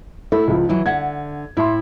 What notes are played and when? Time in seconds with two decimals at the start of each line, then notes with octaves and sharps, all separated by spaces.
0.32 A3 E4
0.48 C#2 F3
0.69 D#3 E3 F#3 E4
0.86 D3 E5 F#5 G#6
1.57 A2 E4 E5 C6